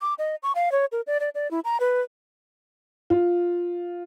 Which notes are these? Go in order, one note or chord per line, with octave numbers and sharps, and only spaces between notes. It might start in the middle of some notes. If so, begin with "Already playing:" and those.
D6
D#5
C#6
F5
C#5
A#4
D5
D5
D5
E4
A#5
B4
F4